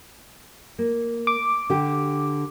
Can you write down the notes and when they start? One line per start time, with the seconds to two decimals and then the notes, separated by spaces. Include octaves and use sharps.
0.78 A#3
1.27 D6
1.70 D3 G4